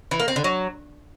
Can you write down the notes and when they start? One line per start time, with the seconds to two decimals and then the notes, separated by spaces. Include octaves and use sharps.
0.11 E3
0.20 A#3
0.28 C4
0.36 D3
0.44 F#3